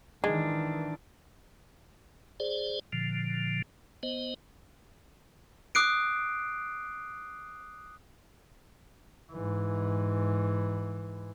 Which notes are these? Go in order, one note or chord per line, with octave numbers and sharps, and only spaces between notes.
D#3 E3 G#3 D4
G#4 C5 D5
A#2 D3 F3
B3 C5 D#5
D6 D#6 F#6 C7 D7
G#2 E3